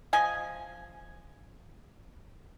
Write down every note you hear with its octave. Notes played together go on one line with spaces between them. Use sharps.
F3 D#5 G#5